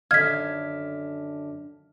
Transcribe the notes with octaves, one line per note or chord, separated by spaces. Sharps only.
F#2 D3 D#3 D#5 F5 F6 G#6 B6